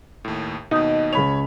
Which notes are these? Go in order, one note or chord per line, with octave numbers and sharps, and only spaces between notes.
D#2 A2
D#2 B2 D#4
C#2 C#5 B5 F7